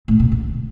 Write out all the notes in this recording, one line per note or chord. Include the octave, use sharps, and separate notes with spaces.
A2
B2
D3